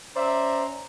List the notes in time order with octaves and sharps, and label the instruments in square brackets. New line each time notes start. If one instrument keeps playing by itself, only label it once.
[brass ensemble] C#4 A#5 [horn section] C5 D5 E5